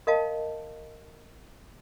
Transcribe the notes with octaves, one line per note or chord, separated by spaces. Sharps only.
A#4 D#5 F5 A5